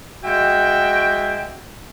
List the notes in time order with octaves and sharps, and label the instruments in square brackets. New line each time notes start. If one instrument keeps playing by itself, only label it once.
[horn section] G#3 F#4 E5 G5